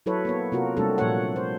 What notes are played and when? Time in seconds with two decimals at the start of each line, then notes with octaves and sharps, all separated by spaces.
0.06 F#3 E4 A4 B4 C#5
0.25 A#3 B3 C#5
0.52 C3 A#3 F4 F#4 A#4
0.77 C3 G3 A3 C4 D4 A4
0.98 A#2 F3 A#3 A4 C#5 F#5
1.36 C5